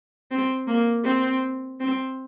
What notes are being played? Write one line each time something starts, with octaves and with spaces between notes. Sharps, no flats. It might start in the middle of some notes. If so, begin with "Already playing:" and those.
C4
A#3
C4
C4